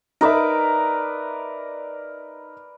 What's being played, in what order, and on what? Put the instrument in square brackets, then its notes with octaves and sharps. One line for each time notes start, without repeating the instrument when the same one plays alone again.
[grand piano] D#4 E5 [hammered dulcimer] A#4 B4 D5